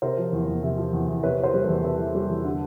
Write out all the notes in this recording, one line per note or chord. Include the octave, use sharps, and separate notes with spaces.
C3 A#4 C5
F3
E2
E2
C3
F3
E2
E2
C3 B4 C#5
E3 A#4 C5
G3
E2 A4 B4
C3 A4 B4
E3
G3
E2
D3